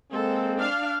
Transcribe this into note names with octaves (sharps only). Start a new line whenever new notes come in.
G#3 A#3 C4 A4
D4 F5